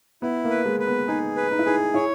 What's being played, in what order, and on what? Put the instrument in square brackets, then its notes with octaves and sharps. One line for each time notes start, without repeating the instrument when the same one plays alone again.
[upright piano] B3 [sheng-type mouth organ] E4
[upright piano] A#3
[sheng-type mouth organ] B4
[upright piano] G#3
[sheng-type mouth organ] B4
[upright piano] B3
[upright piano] D#4 [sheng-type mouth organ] G#4
[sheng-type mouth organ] B4
[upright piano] D#4
E4
[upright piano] D#4 [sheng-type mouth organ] G#4
[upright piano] E4 [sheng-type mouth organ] C#5